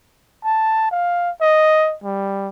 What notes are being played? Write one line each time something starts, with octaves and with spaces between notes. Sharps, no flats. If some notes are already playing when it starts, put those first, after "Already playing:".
A5
F5
D#5
G3